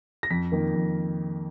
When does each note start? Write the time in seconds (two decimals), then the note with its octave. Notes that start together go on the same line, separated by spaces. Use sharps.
0.23 A#6
0.31 F2 B6
0.52 D#3 A#3
0.75 F2